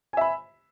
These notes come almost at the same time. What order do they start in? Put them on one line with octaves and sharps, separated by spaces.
G#5 E5 B5